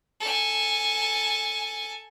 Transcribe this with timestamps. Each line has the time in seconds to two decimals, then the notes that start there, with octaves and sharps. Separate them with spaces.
0.20 A4 G#5